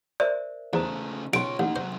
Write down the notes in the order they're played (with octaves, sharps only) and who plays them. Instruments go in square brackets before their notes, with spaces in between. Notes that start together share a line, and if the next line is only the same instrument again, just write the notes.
[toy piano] A#4 C5 E5 [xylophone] D5
[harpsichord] E2 [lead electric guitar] C#3 A3 [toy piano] C5 A#5 D#6
[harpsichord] B1 [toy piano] C#4 G#5 C6 [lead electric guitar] F4 C#5 [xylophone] D7
[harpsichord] A1 [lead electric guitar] A#3 D#4 [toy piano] F#5
[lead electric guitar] C3 F#3 [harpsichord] C5